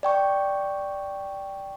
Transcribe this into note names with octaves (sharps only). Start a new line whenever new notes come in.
D5 G5 C#6